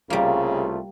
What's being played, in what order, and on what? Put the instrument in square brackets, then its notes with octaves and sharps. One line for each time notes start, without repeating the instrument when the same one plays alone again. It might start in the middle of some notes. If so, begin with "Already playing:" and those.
[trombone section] C2 A3 F4 [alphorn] C#3 [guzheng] G3 A#3